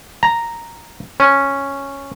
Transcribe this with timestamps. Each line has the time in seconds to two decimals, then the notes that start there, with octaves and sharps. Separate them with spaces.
0.23 A#5
1.20 C#4